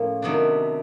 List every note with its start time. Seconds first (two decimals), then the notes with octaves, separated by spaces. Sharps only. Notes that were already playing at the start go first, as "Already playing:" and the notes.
Already playing: A2 F3 A#3 C#4
0.22 C3 D#3 F#3 B3 D4